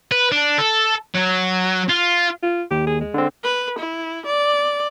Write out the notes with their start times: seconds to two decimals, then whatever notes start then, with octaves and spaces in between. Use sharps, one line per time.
0.12 B4
0.32 D4
0.58 A4
1.15 F#3
1.89 F4
2.43 F4
2.71 D#2 G4
2.87 G#4
3.01 G#3
3.14 D3 C4
3.44 B4
3.79 E4
4.27 D5